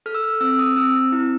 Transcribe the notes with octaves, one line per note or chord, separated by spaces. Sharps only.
A4 F6
E6
F6
C4 E6
D#6
C4 E6
E4